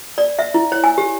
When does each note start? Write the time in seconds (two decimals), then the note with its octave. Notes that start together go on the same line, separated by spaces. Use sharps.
0.18 D5
0.39 E5
0.54 E4
0.72 C#5
0.84 G#5
0.98 G4